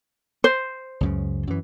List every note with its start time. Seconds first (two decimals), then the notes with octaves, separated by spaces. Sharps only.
0.44 C5
1.01 C#2 F#2 C#3
1.47 F#2 E3